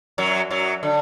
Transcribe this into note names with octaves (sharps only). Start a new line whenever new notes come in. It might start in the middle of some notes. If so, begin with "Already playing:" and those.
F#2 F#3
F#2 F#3
D3